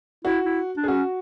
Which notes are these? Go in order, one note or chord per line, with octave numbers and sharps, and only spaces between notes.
E4 F#4
E4
D4
G#4
C#4 F#4